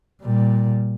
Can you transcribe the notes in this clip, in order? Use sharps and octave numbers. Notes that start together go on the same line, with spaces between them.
A#2 G3